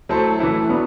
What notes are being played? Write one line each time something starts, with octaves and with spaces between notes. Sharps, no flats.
F#3 A3 E4 A4 C5
E3 A3 E4 A4
F#3 B3 D4